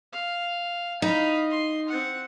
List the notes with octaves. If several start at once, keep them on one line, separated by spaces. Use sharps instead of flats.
F5
D#4 F5 B5
C6
C4 F#5